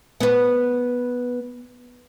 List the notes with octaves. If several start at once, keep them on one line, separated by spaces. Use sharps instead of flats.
B3 B4